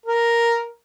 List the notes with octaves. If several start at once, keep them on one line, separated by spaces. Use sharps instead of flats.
A#4